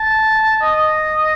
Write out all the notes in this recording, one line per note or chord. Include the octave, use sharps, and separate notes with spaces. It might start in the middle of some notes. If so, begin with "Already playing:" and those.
Already playing: A5
D#5